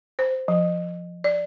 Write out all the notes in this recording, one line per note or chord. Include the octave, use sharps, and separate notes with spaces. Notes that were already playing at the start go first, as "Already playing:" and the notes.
C5
F3
D5